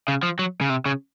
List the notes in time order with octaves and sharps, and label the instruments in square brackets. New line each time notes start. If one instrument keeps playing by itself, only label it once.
[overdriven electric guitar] C#3
F3
F#3
C#3
C3
C#3